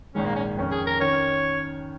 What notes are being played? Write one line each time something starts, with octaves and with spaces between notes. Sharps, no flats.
A#1 G#2 D#3 G#3 C#4
A#3
C#4
F2 D#3 C#4
G#4
A#4
D#3 C#4 C#5